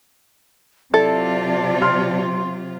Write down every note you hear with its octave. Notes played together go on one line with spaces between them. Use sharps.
C3 F#3 E4 F4 A4 D5 A5
C6 F6